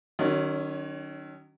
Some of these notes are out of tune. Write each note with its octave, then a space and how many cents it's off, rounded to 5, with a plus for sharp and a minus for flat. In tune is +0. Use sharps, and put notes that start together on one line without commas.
D#3 -25 F#3 +25 C#4 +10